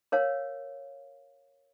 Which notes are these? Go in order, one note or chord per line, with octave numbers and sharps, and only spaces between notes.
A#4 C#5 F5